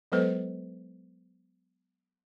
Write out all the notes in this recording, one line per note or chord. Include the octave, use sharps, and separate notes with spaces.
F#3 G#3 B3 A4 B4 C5